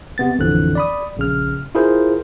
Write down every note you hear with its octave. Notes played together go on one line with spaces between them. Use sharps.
C3 B3 A6
A1 F2 D3 E3 F3 F#6
D5 B5 D#6
A#1 C#3 F6
E4 F4 G#4 A#4 C5